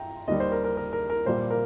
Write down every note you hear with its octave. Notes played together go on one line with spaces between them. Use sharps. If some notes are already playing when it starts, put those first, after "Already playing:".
Already playing: G2 G5 A#5
D#2 D#3 G3 D#5
C5
A#4
A#4
A#4
A#4
A#4
A#1 A#2 G3 A#3 C5
A#4